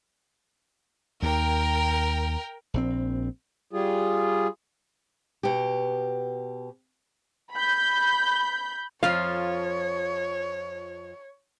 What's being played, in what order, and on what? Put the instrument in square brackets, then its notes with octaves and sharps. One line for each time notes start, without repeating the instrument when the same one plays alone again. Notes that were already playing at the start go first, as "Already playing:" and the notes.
[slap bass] D#2 [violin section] A#4 G5
[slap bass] A#1 D#3 C4
[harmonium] G3 F4 G#4
[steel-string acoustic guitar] B2 G4
[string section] B5 G6
[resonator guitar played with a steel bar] F2 F3 F4 [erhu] C#5 [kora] F5